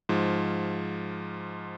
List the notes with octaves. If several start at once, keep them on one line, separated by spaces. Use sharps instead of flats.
G#2 F3